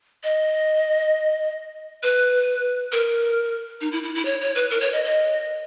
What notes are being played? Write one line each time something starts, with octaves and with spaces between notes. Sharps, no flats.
D#5
B4
A#4
D#4
E4
E4
E4
C#5
C#5
B4
A#4
C#5
D#5
D#5